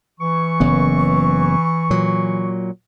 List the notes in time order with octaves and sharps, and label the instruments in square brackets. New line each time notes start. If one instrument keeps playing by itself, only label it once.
[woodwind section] E3 C#6
[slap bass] F#1 C#3 B3
A#2 F#3